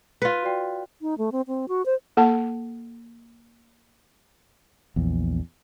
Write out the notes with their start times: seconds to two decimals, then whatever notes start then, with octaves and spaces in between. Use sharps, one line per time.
0.22 F4 B4
0.43 F#4 D5 G5
1.02 D#4
1.18 A3
1.32 C4
1.48 C4
1.69 F#4
1.86 C5
2.17 A#3 A4 F#5 A5
4.96 A#1 E2